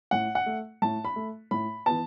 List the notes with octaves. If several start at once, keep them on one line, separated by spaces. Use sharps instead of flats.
A2 F#5
F#5
A3
A2 A5
B5
A3
A2 B5
E3 B3 A5